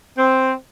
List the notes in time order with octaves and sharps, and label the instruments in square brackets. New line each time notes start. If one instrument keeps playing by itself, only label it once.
[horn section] C4